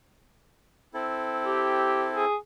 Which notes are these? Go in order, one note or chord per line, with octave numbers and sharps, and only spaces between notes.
C4 E4 A4
G4
G#4